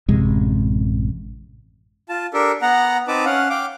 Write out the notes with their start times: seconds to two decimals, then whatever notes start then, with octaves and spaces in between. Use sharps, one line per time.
0.08 A1 F#2 C3 G#3
2.09 F4 A5
2.34 D4 G4 A4 A#4
2.62 B3 F#5 A#5
3.08 C4 D#4 B4 A5 D6
3.25 C#4 F5 F#5
3.50 F5 G5 D6